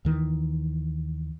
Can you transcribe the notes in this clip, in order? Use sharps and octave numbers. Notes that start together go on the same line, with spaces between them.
D#2 D#3 E3